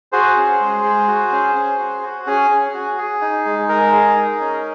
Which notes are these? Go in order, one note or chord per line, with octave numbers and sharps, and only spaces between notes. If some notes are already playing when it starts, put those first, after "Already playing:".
F#4 G#4 C5
C#4
G#3
G#3
F#4
C#4
C#4
F#4
F#4
C#4 G#4
C#4
F#4
G#4
D#4
G#3
G#3 A#4
G#4
D#4
C#4